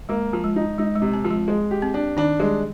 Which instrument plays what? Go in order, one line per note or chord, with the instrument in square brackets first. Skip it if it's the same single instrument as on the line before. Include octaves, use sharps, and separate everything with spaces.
[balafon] G#3 [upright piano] A#3
[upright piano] F3
[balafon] G#3
[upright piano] D#4
[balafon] G#3 [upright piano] D#4
[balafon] G#3
[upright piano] C3
[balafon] C4
[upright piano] F3
[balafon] G#3
[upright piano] G#3
G4
[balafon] C4
[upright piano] D4
[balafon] D#3 D#4 [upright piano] D4
[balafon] G3 G4 [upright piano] G#3